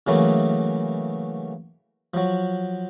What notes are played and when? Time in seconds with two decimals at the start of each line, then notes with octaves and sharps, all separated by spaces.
0.07 C#3 E3 F#3 A3 A#3
2.14 F3 F#3